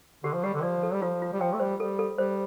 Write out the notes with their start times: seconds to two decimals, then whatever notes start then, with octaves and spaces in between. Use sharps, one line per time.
0.24 D3 G4
0.34 F3
0.43 G3 G4
0.54 D3
0.63 F3 D5
0.83 A4
0.93 G3
1.02 F3 F4
1.22 F4
1.33 G3
1.40 F3 G5
1.53 A3
1.60 G3 C5
1.80 G3 A4
1.99 A4
2.18 G3 C5